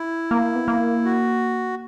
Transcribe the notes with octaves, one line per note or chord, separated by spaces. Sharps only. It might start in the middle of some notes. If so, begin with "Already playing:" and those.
Already playing: E4
A#3
B3
A#3
F#4